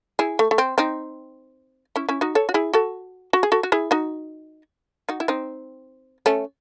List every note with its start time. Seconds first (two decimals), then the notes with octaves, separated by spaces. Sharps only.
0.19 E4 G#4
0.39 A3
0.51 A3
0.58 C4
0.78 C4 D#4
1.96 C#4 E4
2.09 C#4 E4
2.21 D#4 F#4
2.35 A4 C#5
2.49 F#4
2.54 E4 G#4
2.74 F#4 A4
3.33 F#4
3.43 G#4
3.52 F#4 A4
3.63 F#4
3.72 E4 G#4
3.91 D#4 F#4
5.09 D#4 F#4
5.20 E4
5.28 C4 D#4
6.26 A3 C#4